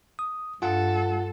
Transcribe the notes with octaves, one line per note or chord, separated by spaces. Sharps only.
D#6
G2 F4 A4 F#5